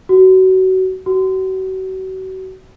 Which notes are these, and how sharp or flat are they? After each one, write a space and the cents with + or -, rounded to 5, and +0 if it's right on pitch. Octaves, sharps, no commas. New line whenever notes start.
F#4 +25
F#4 +35